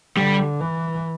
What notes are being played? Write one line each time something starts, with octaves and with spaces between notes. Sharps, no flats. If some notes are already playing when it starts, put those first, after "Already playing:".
D3 G3
E3